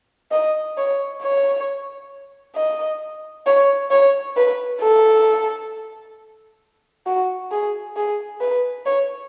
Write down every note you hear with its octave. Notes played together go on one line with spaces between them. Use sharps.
D#5
C#5
C#5
D#5
C#5
C#5
B4
A4
F#4
G#4
G#4
B4
C#5